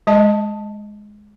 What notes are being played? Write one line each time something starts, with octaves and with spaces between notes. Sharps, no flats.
G#3 D#5 A5